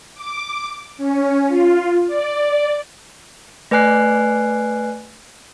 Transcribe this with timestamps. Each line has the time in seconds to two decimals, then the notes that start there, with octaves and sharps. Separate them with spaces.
0.15 D6
0.97 C#4
1.48 F4
2.07 D5
3.71 A3 B4 D5 G#5 F#6 C7